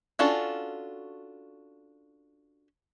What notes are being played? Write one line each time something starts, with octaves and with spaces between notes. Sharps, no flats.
C#4 D4 F4 F#4 A4